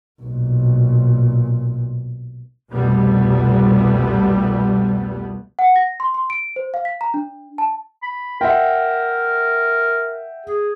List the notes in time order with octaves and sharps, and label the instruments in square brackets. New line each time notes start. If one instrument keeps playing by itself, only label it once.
[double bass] B1 A#2
[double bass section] C2 F2 B2 G3 A3 B3
[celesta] F#5
A#6
C6
C6
D7
C5
F5
B6
A#5
D4
A5
[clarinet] B5
[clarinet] A#4 [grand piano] E5 F#5 G5
[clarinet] G#4